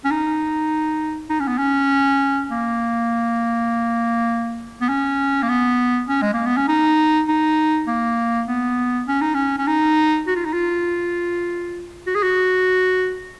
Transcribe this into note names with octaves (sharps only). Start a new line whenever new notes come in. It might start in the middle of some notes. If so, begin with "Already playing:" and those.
C#4
D#4
D#4
C#4
B3
C#4
A#3
B3
C#4
A#3
B3
C#4
G#3
A#3
B3
C#4
D#4
D#4
A#3
B3
C#4
D#4
C#4
C#4
D#4
F#4
F4
D#4
F4
F#4
G#4
F#4